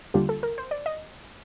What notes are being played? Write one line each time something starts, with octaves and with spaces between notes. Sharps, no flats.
D#2 D3 G3 D4 F4 G4
A4
A#4
C5
D5
D#5